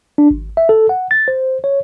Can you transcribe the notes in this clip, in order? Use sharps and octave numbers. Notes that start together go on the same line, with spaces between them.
D4
G#1
E5
A4
F#5
A6
C5
C#5